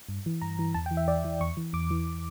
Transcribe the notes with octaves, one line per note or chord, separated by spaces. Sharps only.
G2
E3
G2 A#5
E3
E2 A5
G5
E3
E5
E2 D5
E3
E2 C#6
E3
E2 D6
E3